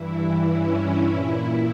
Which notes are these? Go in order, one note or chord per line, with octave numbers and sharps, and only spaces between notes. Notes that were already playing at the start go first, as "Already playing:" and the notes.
Already playing: G2 E3 E4
C#4
E4
A#2